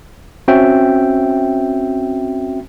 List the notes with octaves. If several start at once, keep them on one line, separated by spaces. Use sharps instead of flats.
C4 C#4 F#4 E5 G5